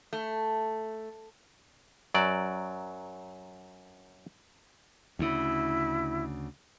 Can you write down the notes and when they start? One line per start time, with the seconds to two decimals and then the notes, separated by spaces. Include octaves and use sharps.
0.13 A3
2.14 F#2 F#3 D5
5.19 D2 C#3 E4